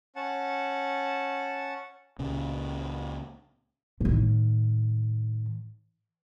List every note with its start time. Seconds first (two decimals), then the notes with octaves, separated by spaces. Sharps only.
0.16 C#4 F#5 A5
2.19 C#2 A#2 C#3
4.00 A2 D#3